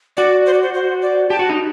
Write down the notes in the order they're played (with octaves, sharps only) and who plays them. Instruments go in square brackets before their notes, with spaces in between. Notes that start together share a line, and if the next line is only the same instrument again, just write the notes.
[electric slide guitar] F#4 [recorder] D5
[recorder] C5
D5
C5
C5
D5
[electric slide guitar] G4 [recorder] A5
[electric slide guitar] F#4
D#4